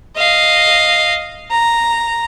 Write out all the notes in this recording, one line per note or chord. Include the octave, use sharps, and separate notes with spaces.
D#5 F5
A#5